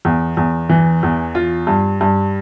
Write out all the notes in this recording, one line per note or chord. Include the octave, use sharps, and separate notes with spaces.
E2
E2
E3
E2
F4
G2
G2